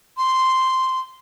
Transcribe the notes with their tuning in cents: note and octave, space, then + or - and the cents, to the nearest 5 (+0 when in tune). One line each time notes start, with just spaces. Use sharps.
C6 -5